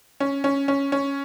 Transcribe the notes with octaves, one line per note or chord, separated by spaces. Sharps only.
C#4
C#4
C#4
C#4